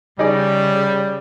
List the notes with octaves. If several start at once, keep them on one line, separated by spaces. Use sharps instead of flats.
C#3 G3 D#4 G#4 D5